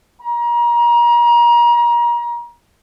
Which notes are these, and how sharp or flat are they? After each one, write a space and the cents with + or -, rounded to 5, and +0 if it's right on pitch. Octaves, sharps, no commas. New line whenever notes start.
A#5 +30